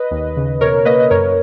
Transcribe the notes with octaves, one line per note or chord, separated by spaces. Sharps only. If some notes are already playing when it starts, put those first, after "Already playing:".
Already playing: B4 D#5
D#2
C#3
B2 A#4 C#5
A#3 B4 D#5
D#5
F#2 A#4 C#5